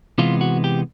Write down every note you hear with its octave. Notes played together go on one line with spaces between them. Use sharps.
C3 E3 G#3 B3 F4
F#4
G4